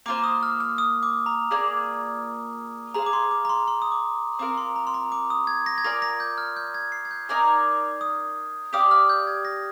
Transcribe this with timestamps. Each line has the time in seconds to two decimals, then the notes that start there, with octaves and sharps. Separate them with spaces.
0.06 A#3 F4 C5 D6
0.24 D#6
0.43 F6
0.60 F6
0.78 D#6
1.03 D6
1.26 A#5
1.51 A#3 F4 G#4 D5
2.94 G#4 C5 F5 A#5
3.06 D6
3.13 C6
3.31 D6
3.45 A#5
3.49 C6
3.68 C6
3.82 D#6
3.92 D6
4.39 C4 F4 A#4 D6
4.58 C6
4.76 A#5
4.87 C6
4.94 A#5
5.12 D6
5.30 D#6
5.47 G#6
5.66 A#6
5.78 G#6
5.84 F4 A#4 D5 G#5 A#6
6.02 A#6
6.20 G6
6.38 F6
6.56 G6
6.74 G#6
6.92 C7
7.05 G#6
7.11 G6
7.29 D#4 A#4 D5 G#5
8.01 D#6
8.73 G4 D5 F5 D#6
8.91 F6
9.09 G6
9.27 G#6
9.45 A#6